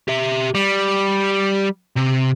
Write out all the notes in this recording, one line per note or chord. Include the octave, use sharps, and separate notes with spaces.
G4 E5
G3
C3